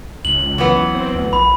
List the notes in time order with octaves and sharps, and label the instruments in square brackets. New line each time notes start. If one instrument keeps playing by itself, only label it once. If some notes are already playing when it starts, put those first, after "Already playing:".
[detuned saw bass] C#2 [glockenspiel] F#7
[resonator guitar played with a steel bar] E3 F#3 B3
[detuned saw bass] C4
D2
[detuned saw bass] A#1 [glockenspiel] B5